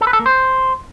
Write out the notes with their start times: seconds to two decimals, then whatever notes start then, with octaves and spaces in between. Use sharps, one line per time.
0.01 A4
0.07 B4
0.13 A4
0.19 A#3
0.26 C5